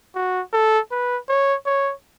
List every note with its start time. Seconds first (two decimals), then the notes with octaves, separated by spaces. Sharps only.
0.15 F#4
0.53 A4
0.91 B4
1.29 C#5
1.66 C#5